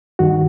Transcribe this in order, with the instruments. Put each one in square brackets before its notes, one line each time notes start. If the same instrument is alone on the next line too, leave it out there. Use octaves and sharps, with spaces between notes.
[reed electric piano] G2 D#3 F#4